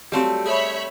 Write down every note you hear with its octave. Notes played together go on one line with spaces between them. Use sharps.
F#3 G3 A3 C4 F4 G4
G#4 C#5 E5 B5